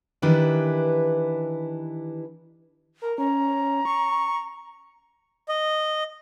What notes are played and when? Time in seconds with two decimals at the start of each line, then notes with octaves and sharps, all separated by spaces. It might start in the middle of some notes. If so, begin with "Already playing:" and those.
0.22 D#3 E3 D4 E4 G4 B4
3.02 A#4
3.18 C#4 A#5
3.85 C#6
5.49 D#5